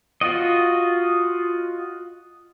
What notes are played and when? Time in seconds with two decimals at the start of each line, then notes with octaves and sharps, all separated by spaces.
0.21 F4 F#4 D#5